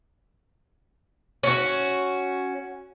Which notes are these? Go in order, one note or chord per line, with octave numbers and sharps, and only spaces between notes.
C#4 F#4